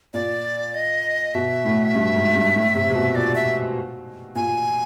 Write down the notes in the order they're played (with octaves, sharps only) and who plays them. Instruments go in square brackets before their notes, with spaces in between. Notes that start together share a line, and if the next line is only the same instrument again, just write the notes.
[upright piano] A#2 [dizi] D5
[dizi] D#5
[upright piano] B2 [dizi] E5
[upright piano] A2
G2
G#2
G2
A2
C3
C3
B2
[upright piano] A#2 [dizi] D5
[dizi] E5
[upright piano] A#2 [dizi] G#5